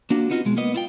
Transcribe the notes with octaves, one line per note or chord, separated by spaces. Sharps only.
A#3 D4 F4 F#4
B3 C4 D#4 F4 F#4
B2 G#3
A#3 B3 D#5
E4 F4 G5